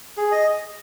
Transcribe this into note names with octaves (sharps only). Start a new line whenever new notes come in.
G#4
D#5